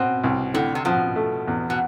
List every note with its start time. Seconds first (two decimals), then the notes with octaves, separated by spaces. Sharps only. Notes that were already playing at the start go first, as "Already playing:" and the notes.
Already playing: B2 C4
0.24 C2
0.54 A2 D3
0.75 C3
0.85 B2 F3
1.16 A3
1.48 E2
1.70 B2